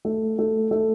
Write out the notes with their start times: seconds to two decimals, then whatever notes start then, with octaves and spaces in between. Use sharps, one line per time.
0.05 A3
0.39 A3
0.71 A3